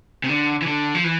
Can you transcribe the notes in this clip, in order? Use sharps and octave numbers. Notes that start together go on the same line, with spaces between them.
C3
D3
E3
D3
F3
E3